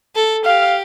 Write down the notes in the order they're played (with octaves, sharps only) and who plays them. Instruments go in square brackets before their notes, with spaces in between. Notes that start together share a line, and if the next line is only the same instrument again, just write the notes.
[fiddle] A4
[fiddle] G4 [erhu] F5